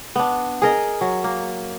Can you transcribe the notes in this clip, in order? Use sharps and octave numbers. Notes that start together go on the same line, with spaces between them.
B3 D4
G#4 A#4 D#5
F#3
A#3